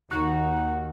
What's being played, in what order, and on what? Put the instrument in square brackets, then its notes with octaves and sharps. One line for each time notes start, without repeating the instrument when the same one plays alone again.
[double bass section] D#2 [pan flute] D#4 [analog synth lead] F#4